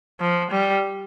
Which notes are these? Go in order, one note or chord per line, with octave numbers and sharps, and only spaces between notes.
F3
G3